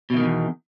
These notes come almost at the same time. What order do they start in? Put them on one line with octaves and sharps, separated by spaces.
B2 E3 D#3 G#2 E2